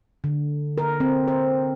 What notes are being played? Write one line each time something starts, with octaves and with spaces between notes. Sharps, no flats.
D3
A#4
C4
C5